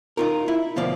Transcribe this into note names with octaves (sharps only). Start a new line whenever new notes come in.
D#4 F4 A#4
E4
D2 B2 F3 D5